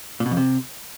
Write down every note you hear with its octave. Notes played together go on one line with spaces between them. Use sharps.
A#2
B2
F2
C3